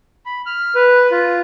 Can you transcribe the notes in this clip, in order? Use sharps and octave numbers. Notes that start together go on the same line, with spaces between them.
B5
F6
B4
F4